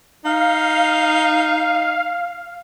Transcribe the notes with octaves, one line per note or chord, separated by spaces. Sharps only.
D#4 F5